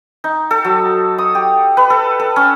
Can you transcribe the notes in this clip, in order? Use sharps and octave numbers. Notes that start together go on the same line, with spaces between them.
D#4
A4
F#3
D#6
G4
B4
A4
A4
C#4